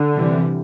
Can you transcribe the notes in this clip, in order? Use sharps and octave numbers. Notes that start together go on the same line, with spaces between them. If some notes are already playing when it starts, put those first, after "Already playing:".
Already playing: D3
C3 E3 G3